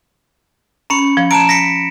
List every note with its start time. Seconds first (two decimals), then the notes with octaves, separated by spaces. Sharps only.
0.90 C#4 A#5 B5 C#7
1.17 F3
1.31 A5 A#5 D7 E7
1.49 A#6 B6 C#7